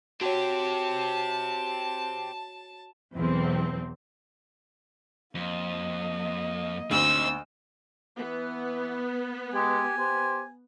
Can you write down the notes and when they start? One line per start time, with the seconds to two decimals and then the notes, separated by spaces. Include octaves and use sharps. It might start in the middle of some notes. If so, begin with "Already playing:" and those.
0.21 C4 F#4 G4 C#5 A5
3.15 B1 E2 C4
5.35 F2 A#3 D#5
6.91 D2 C4 D#4 C5 E6
8.18 E3 B3
9.54 G#3 G4 G#5
9.99 G4 C5